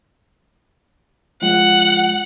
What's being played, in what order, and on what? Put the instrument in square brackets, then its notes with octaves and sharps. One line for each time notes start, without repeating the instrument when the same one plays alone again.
[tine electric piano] F3 G#3 F4 [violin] F#5